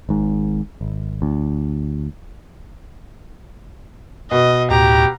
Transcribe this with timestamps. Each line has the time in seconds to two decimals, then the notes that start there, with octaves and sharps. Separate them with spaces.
0.09 G#1 G#2
0.81 G#1
1.22 D2
4.31 B2 D#5
4.71 D2 A2 G4 A#5